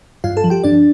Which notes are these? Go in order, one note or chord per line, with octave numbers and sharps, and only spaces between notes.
G2 F4 F5
A4 A5
F3
G4 G5
G2 D4 D5